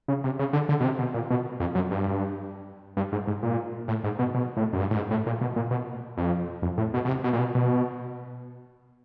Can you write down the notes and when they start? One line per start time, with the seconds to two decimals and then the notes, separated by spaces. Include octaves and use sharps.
0.08 C#3
0.24 C3
0.39 C#3
0.53 D3
0.69 D3
0.80 B2
0.84 C3
0.99 B2
1.14 A#2
1.30 B2
1.60 F2
1.75 F#2
1.91 G2
2.97 G2
3.12 G#2
3.27 G#2
3.43 A#2
3.88 A2
4.04 G#2
4.19 B2
4.34 B2
4.57 A2
4.73 F#2
4.80 G2
4.91 A2
4.95 G#2
5.11 A2
5.26 A#2
5.41 B2
5.56 A#2
5.71 B2
6.17 F2
6.62 F2
6.77 A2
6.94 B2
7.05 B2
7.08 C3
7.24 B2
7.33 A#2
7.39 B2
7.55 B2